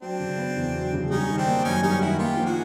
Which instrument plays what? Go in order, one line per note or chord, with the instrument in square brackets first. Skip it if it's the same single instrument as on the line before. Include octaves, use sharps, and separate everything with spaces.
[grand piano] F#3 [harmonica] C4 D4
[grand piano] C#3
B3
E2
F#3
C#3
[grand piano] G3 [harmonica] C#4 D#4
[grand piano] D#3
[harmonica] C4 D4
[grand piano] A#3
[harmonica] D4
[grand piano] F#2 [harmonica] C#4 D#4
[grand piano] G3 [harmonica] C#4 D#4
[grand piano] D#3 [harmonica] E4 F#4
[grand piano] A#3 [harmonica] F4 G4
[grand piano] F3
[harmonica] F#4 G#4